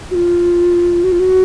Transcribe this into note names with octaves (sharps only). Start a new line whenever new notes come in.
F#4
F4
F#4
F4
F#4